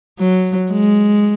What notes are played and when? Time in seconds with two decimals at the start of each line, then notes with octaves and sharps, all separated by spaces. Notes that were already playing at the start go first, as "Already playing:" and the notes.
0.19 F#3
0.72 G#3